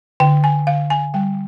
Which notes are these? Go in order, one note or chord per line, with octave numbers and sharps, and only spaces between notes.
D3 G5
G#5
D3 F5
G#5
G3 G5